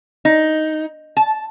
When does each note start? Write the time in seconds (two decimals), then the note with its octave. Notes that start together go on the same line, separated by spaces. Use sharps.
0.25 D#4
1.17 A5